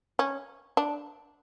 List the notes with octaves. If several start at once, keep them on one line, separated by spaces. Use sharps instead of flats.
C#4
D4